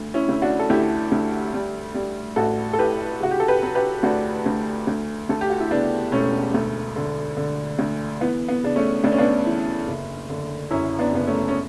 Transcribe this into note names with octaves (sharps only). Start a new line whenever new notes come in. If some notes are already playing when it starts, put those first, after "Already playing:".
Already playing: D2
C#4 E4
D2 E4
D4 F#4
A4
D2 E4 G4
D2
G3
G3
A1 F#4 A4
A4
A2 G4 B4
C#3 F#4
G4
A4
G4 B4
F#3
G4 B4
D2 D4 F#4
D2
D2
D2 A4
G4
F#4
E4
C#3 B3 D4
E1 A3 C#4
D2 A3
D3
D3
D2
E3 B3
B3
C#3 D4
A3 C#4
D2 D4
C#4
B3 D4
E3
F#1
D3
F#2 C#4 E4
B3 D4
F#1 B3
A3 C#4
C#4